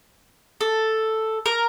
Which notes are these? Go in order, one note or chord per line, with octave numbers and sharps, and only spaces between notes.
A4
A#4